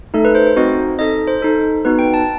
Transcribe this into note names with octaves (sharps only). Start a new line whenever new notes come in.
A3 D#4 A4
B4
C5
C5
C4 D#4 F#4 D#5
D#4 A4 D#5
C5
D#4 A4
B3 D#4 F#4 B4
G5
A5